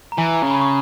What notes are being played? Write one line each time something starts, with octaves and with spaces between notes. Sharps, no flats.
A#5
E3 G#5
A#5
C#3
B5
C#6